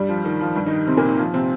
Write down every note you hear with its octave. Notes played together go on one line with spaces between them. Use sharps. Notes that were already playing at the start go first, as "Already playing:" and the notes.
Already playing: G2 G3
F3
D#3
F3
G2 G3
D#3 D#4
C3 C4
A#2 A#3
D#3
F3
C3 C4